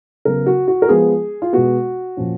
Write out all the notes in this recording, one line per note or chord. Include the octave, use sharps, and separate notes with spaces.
C#3 F#3 B3 A#4
F#4
F#4
A#4
F3 G#3 B3 G#4
F4
B2 G#3 B3 F#4
A#2 F3 A#3 C#4